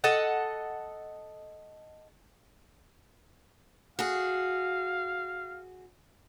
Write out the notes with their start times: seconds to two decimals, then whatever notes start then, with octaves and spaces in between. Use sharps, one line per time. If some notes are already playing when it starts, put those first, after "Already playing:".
0.04 A4 D#5 F#5
3.99 F#4 G#4 F5